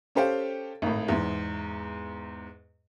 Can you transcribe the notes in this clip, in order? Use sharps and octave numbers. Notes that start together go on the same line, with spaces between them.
C#4 G4 A4 C5 F5 G5
G#1 A2
E2 G#2